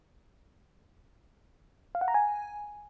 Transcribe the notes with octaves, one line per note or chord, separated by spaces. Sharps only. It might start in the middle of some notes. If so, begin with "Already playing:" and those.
F5
F#5
A#5
G#5